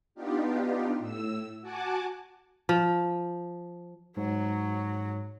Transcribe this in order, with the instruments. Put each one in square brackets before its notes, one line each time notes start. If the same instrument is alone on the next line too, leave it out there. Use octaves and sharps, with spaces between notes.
[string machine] B3 D4 D#4 F4 G4
A2 E6
F#4 F#5 G#5 A5 D6
[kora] F3
[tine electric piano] G#2 [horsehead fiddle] F#3 F#4